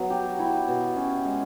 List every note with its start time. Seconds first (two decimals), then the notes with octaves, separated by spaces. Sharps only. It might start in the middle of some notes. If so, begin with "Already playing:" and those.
Already playing: F#3 B3
0.10 G4
0.39 E4
0.68 B2
0.96 C#4
1.25 G#3